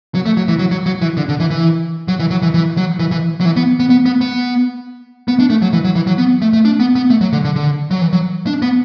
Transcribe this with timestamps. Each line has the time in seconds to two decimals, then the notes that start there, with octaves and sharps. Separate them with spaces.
0.15 F#3
0.26 A3
0.37 F#3
0.48 E3
0.59 F#3
0.71 F#3
0.86 F#3
1.02 E3
1.17 D3
1.29 D3
1.40 E3
1.50 E3
2.08 F#3
2.19 E3
2.30 F#3
2.42 E3
2.54 E3
2.77 F#3
2.99 E3
3.11 E3
3.40 F#3
3.45 E3
3.56 B3
3.80 B3
3.90 B3
4.06 B3
4.21 B3
5.28 B3
5.40 D4
5.50 A3
5.62 F#3
5.73 E3
5.84 F#3
5.95 E3
6.07 F#3
6.18 B3
6.42 A3
6.53 A3
6.65 D4
6.80 B3
6.95 B3
7.10 A3
7.21 F#3
7.33 D3
7.44 D3
7.56 D3
7.91 F#3
8.01 E3
8.13 F#3
8.47 D4
8.62 B3